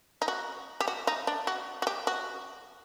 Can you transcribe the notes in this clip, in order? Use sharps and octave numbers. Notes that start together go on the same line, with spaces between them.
D#4
F#4
G4
F#4
D#4
D4
F#4
F#4
G4
F#4